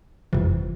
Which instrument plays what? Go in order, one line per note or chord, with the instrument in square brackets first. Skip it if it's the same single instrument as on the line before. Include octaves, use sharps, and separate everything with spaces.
[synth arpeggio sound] G1 F2 C3 E3